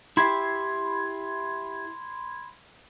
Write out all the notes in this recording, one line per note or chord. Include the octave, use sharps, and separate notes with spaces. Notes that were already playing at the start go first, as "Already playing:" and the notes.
E4 G4 E5 B5 C6 G#6